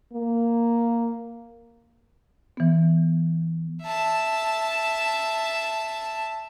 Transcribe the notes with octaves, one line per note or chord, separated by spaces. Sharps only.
A#3
E3 B3
E5 A5